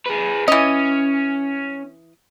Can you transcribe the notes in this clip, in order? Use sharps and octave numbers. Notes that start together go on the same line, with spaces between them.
G#4 B4
E3 C#4 D#5